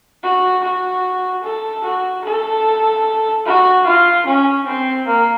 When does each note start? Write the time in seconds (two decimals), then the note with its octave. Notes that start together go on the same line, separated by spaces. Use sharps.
0.23 F#4
0.63 F#4
1.43 A4
1.84 F#4
2.25 A4
3.46 F#4
3.85 F4
4.26 C#4
4.66 C4
5.07 A#3